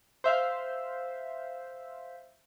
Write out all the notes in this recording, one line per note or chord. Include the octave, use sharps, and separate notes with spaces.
C5 E5 F5